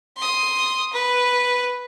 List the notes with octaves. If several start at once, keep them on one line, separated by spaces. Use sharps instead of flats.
C6 D#6
B4